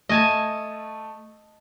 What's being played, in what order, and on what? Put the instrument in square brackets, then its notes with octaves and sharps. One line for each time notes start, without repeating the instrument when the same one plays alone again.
[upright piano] A3 [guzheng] D#5 G#5 A5